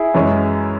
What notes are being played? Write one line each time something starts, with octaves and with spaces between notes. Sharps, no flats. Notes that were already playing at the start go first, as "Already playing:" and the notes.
Already playing: E4 G#4
F#2 E3 G#3 C#4